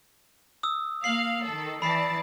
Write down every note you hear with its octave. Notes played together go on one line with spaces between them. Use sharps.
D#6 E6
A#3 F5 C7 F#7
D#3 A4
E3 D5 A5 B5 C7